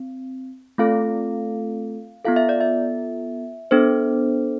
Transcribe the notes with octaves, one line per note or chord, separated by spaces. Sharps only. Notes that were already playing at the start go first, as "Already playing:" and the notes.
Already playing: C4
A3 C4 F4 A4 F5
B3 F4 A4 F5
E5
D5
E5
B3 D4 A4 C5